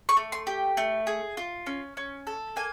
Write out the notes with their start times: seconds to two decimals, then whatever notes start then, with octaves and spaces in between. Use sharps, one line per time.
0.09 C#6
0.17 A3
0.32 C6
0.47 G4
0.77 A3
1.07 G#4
1.37 F4
1.66 C#4
1.97 C#4
2.27 A4
2.56 A#3 G#5